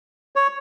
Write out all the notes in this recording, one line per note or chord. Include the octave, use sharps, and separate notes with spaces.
C#5